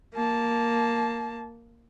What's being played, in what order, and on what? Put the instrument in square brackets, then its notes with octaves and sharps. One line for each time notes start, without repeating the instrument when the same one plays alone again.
[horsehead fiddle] A#3 A5